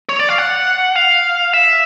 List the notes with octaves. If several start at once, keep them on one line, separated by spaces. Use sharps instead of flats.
C#5
D5
F5
F#5
F5
E5